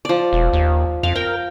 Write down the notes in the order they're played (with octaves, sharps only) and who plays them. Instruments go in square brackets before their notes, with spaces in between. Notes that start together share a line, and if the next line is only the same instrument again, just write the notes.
[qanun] F3 D5
[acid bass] E1
D#2
[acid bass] F2 [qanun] F5
[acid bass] A#4 [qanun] G5